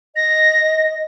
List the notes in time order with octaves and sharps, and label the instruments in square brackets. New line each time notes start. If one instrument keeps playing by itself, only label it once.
[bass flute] D#5 [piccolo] A#6